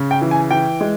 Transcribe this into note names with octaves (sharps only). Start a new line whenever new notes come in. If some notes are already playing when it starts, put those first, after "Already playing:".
Already playing: C#3
G5
E3
G#5
E3 G5
G#3